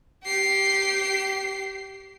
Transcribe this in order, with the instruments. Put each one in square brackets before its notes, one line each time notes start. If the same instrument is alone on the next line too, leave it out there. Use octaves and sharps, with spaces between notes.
[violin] G4 C7